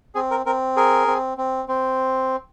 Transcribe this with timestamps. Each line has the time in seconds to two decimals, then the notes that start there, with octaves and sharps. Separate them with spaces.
0.15 C4 G#4
0.31 A#4
0.46 C4 A#4
0.76 G#4 A#4
1.07 C4
1.38 C4
1.68 C4